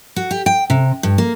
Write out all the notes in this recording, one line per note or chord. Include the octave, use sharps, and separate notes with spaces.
F#4
G4
G5
C3
G2
A#3